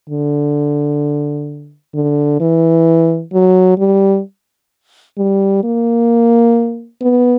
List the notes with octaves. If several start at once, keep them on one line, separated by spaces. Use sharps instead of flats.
D3
D3
E3
F#3
G3
G3
A#3
B3